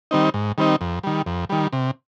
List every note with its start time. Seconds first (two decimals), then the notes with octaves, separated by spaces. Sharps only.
0.11 D#3 G3 C4 D#4
0.34 G#2
0.58 D#3 G3 C4 D#4
0.81 F2
1.03 D#3 G3
1.26 F2
1.49 D#3 G3
1.73 C3